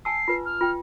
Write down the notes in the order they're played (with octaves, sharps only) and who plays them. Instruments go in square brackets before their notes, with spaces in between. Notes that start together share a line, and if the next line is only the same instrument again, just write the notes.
[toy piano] G#5 A5 E6 [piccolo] C7
[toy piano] F4 B4
[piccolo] F6
[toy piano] F4 G5